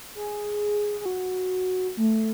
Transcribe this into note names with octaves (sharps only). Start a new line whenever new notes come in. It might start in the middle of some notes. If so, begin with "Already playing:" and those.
G#4
G#4
F#4
A3